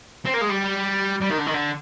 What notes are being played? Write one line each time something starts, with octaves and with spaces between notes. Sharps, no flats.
C4
A#3
G#3
G3
G3
D#3
D3
D#3
D3